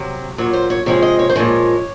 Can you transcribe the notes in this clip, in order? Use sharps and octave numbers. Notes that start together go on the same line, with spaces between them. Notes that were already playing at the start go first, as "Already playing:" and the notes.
Already playing: C3 F#3
A#2 F#3 C#5
C5
C#5
C3 F3 G#3 C#5
D#5
C#5
C5
A#2 F3 G#3 C#5